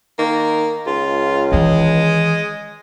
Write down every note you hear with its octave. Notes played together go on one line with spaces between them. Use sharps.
D#3 A#3
C#2 F4
D#3 E3 G#3